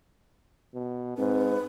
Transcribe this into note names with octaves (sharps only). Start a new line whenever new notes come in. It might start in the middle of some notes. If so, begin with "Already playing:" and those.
B2
G#2 C4 B4